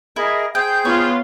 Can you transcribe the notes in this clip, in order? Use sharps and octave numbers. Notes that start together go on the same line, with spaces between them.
E4 G#4 A#4 D#5
G#4 C5 G5 G6
B3 F4 C#5